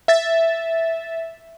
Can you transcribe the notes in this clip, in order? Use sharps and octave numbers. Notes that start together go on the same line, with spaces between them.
E5 A6